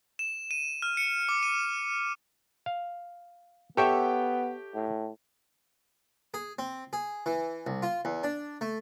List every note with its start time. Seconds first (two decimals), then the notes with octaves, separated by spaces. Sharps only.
0.19 E7
0.51 D#7
0.82 F6
0.97 C#7
1.29 D6
1.43 D#7
2.66 F5
3.77 B3 G4 A4 C#5 E5 G5
4.75 A2
6.34 G#4
6.59 C4
6.93 G#4
7.26 E3
7.67 C2
7.83 F4
8.05 E2
8.24 D4
8.61 A3